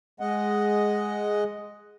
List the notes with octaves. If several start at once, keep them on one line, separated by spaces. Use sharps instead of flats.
G#3 D#5 F#5